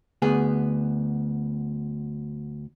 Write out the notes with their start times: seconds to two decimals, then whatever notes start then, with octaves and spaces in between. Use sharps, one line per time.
0.22 D2 B3 G#4